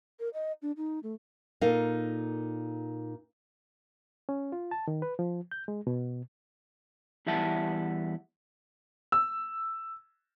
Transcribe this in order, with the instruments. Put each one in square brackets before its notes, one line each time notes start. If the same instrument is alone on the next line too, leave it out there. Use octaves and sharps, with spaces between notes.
[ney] A#4
D#5
D4
D#4
A3
[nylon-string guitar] A#2 D#4 A4 A#4 F5
[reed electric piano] C#4
F4
A5
D#3
B4
F3
G6
G#3
B2
[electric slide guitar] E2 G3 E4 E5 F#5 A5
[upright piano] E6